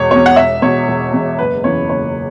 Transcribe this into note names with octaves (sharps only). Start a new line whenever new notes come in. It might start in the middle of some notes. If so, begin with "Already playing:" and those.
Already playing: E1 E2 B2 C#5
E2 B2 C#5
F#5
E1 E5
E2 B2 C#5
E1
E2 B2
F#1 B4
E2 C#3 E3 C#5
F#1 C#5